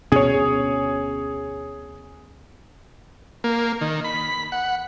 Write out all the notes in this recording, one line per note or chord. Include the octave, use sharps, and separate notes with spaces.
D2 B2 C#4 G#4 C#5
A#3
D#3
B5
F#5